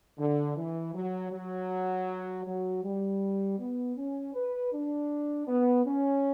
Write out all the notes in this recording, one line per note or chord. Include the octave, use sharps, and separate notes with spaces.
D3
E3
F#3
F#3
F#3
G3
B3
C#4
B4
D4
B3
C#4